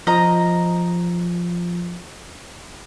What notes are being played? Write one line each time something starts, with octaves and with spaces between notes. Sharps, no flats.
F3 D#5 A#5